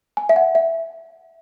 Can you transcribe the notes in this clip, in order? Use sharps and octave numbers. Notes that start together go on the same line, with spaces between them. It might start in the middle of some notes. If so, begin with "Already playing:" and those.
G#5
E5
F#5
E5